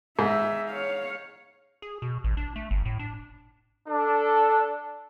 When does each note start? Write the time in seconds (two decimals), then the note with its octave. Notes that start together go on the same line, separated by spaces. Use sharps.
0.19 G#2 E5
0.70 C#5 F5
1.82 G#4
2.02 B2
2.24 A1
2.37 D4
2.56 A3
2.71 G1
2.85 A2
2.99 D4
3.88 D4 A4